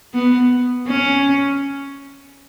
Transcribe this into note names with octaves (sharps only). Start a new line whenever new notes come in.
B3
C#4